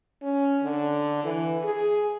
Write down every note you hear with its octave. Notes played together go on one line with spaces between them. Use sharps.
C#4
D3
E3
G#4